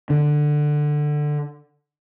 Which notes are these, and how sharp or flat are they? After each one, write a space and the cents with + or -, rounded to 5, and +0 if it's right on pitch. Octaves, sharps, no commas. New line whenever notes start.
D3 +15